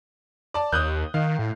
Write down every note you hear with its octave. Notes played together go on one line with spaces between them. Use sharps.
D5 A5
D#2 D#6 F#6 G6
D#3 F5
A2